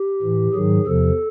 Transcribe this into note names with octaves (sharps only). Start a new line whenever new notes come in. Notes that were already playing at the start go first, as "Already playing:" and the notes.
Already playing: G4
A2 E3
G#2 D#3 F#3 G#4
E2 C3 F3 A4